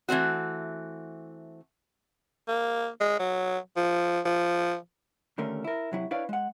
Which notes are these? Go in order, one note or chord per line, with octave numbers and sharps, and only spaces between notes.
E3 A3 C4 F#4
A#3
G#3
F#3
F3
F3
D#2 D3 A3 C#4 A#4
E4 A#4
C3 F#3 E4
D4 E4 B4 C#5 D5 F5
G#3 F#5